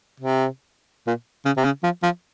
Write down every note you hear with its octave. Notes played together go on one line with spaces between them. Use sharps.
C3
A#2
C#3
C3
C#3
F3
F3